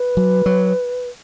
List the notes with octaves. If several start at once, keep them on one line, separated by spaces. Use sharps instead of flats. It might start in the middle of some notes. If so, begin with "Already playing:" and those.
Already playing: B4
F#3
F#3